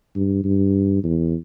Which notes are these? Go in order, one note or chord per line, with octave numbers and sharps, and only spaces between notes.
G2
G2
E2